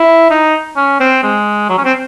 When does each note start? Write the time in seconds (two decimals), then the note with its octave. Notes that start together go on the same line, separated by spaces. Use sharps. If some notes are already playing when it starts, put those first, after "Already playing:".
Already playing: E4
0.30 D#4
0.76 C#4
1.00 C4
1.23 G#3
1.69 F#3
1.78 C#4
1.85 C4